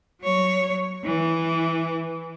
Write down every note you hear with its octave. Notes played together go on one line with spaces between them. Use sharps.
F#3 C#5
E3